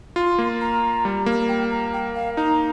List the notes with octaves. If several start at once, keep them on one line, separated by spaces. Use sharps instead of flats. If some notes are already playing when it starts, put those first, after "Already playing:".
F4 C6
A#3
A#5
G3
A#3
G5
A#5
G5
F5
D#4 A#5